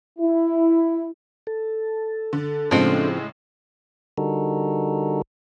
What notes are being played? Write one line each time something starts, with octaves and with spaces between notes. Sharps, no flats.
E4
A4
D3
A2 C#3 F3 G#3 C4 D4 A4
D3 G3 D#4 F#4 A4 A#4